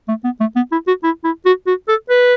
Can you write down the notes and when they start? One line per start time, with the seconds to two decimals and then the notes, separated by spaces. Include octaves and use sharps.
0.08 A3
0.24 B3
0.40 A3
0.56 B3
0.72 E4
0.87 F#4
1.04 E4
1.24 E4
1.46 F#4
1.67 F#4
1.88 A4
2.10 B4